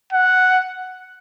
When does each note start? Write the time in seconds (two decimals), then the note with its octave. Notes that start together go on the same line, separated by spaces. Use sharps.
0.13 F#5